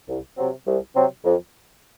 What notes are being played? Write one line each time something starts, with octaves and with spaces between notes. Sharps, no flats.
C2
C3 F#3 C4
C2
C3 F#3 C4
F2